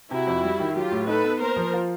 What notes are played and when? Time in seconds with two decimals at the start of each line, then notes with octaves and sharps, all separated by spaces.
0.11 C3 E4 F#4
0.27 F2
0.43 G3
0.60 D#3
0.76 F#3 F4 G4
0.91 A2
1.07 D#4 A4 B4
1.24 B3
1.40 A#3 A#4 C5
1.56 F3
1.73 F4